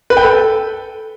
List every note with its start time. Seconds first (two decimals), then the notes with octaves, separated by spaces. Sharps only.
0.10 B4
0.17 G5
0.23 A4